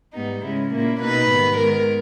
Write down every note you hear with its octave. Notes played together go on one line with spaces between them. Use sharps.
G#2 G3 B3 D#4
C#3 G#3 C#4 E4
A#2 A#3 C#4 E4
B2 A#3 D#4 B4
G#2 D#3 G3 B3
D#3 G#3 B3 A#4